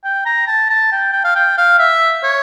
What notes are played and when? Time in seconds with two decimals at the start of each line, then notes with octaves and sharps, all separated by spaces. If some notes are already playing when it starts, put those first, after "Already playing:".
0.04 G5
0.25 A#5
0.47 A5
0.70 A5
0.92 G5
1.13 G5
1.24 F5
1.36 G5
1.58 F5
1.79 E5
2.23 C#5